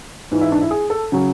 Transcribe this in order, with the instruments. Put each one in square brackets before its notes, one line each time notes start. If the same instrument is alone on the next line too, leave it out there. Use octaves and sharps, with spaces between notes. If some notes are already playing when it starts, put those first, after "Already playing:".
[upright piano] G#2 E3
E4
D4
E4
G#4
A4
C#3 F#3